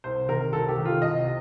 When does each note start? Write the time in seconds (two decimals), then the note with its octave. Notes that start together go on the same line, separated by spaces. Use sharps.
0.04 C2 C5
0.29 C3 D#3 A#4
0.53 C2 A4
0.69 G4
0.78 C3 D#3
0.85 F4
1.02 C2 D#5
1.25 C3